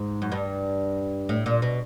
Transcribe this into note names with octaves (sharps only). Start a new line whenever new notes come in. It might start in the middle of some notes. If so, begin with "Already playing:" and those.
Already playing: G#2
F#2
G2
A2
A#2
B2